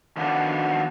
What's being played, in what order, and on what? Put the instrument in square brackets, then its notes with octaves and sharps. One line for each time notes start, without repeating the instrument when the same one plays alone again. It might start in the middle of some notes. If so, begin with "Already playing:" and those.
[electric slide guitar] D#3 F3 B3 D4 F#4 A4